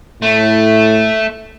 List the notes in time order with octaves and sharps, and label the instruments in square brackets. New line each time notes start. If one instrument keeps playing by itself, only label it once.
[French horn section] A2 [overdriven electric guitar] A3